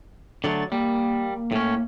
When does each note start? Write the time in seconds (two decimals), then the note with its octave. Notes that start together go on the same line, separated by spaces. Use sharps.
0.44 D3 F#3 A3 A6
0.72 G3 A#3
1.52 A2 C#4